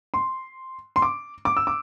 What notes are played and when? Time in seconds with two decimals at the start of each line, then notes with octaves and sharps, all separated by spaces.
0.14 C6
0.96 C6
1.02 D6
1.45 D6
1.57 E6
1.67 D6